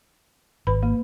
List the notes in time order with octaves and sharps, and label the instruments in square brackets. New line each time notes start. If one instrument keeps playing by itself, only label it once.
[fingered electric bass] G#1 [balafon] B4 B5
[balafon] A#3